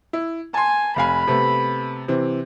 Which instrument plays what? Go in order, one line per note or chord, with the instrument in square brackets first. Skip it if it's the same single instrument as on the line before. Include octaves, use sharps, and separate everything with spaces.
[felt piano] E4
[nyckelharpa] G#5 [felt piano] A5 C6
[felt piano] F1 F5 G#5 [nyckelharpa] B5
[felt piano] C3 A3 B3
C3 E3 C4